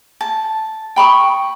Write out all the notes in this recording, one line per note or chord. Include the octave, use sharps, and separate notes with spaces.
A5
G5 B5 C#6 D#6